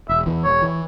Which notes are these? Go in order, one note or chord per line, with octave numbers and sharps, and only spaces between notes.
E1 E5
E2 E3
E1 C#5
E3